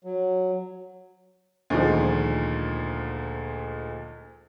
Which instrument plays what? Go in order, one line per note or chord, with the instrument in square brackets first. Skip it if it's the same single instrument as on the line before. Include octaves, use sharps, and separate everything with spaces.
[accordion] F#3
[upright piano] D2 A#2 D#3 F3 G#3